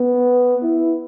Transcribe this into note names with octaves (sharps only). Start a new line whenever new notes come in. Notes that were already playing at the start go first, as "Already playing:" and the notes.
Already playing: B3
E4